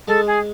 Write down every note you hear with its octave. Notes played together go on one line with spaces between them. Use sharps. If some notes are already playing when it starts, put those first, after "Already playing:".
G#3 A4
G#4